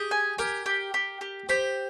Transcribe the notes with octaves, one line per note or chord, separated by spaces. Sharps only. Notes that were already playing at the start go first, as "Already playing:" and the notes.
Already playing: G4 G#4
G#5
G4 A#4
G4
G4
G4
G4 C5